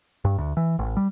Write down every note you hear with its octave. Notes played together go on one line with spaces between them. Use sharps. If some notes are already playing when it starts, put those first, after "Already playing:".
G2
D2
E3
A1
G3